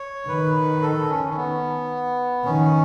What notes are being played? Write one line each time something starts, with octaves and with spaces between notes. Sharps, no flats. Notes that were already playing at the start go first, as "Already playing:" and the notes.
Already playing: C#5
D#3 B4
A4
C#4
C#4
B3
D#3 C#4